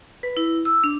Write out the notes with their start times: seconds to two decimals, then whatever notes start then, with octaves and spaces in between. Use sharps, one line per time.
0.23 B4
0.37 E4
0.65 E6
0.84 D4